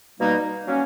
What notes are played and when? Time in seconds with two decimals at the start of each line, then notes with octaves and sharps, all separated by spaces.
0.18 B2 G3 A#3 D#4
0.65 F#3 A#3 C#4